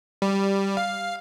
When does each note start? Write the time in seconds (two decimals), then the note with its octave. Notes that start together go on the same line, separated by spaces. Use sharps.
0.22 G3
0.77 F5